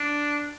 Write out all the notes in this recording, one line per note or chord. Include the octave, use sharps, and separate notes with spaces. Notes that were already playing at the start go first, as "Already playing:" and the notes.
Already playing: D4